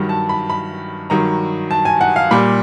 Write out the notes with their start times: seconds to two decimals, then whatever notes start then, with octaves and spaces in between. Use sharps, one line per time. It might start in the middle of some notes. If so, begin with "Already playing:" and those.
Already playing: G2 D#3 F#3
0.09 A5
0.29 B5
0.50 B5
1.10 G2 D#3 F#3 A#5
1.71 A5
1.85 G#5
2.01 F#5
2.16 F5
2.31 A#2 G3 B5